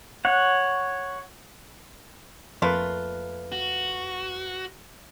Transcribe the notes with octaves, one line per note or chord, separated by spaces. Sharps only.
C#5 F#5
F2 A3 A#3 F4 B4 F#6
F#4